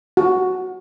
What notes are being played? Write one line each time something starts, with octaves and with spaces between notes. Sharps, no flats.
F#4